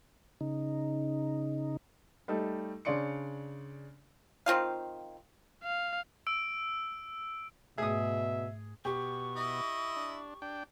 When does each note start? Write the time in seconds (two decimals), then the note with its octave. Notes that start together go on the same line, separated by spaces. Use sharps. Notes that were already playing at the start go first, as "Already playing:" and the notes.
0.41 C#3 D#4
2.28 G3 A3 D#4 A4
2.85 C#3 D4 C#5 D5 C6 C#7
4.46 D#3 C4 F4 F5
5.64 F5
6.27 E6 D7
7.78 G#2 B2 A3 G#4 E5 D#6
8.85 B2 G4 C#6
9.36 E4 D#5
9.96 D4
10.42 D4 G5